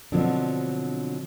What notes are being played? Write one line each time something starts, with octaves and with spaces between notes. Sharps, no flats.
B2 D3 F3 F#3 C4 D4